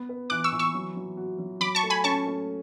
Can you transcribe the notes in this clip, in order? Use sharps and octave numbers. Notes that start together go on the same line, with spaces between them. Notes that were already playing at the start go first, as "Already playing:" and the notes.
Already playing: B3
B4
E3 D6 F#6
C#6 E6
E3
C#6 E6
F#3
F#3
F#4
F#3
F#3 B5 D6
A5 C#6
A3
G#5 B5
C#4 A5 C#6
A3